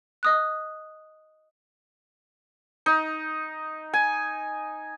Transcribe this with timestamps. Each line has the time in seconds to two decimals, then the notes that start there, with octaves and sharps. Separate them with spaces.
0.23 D#5 D#6 F#6
2.86 D#4
3.93 G#5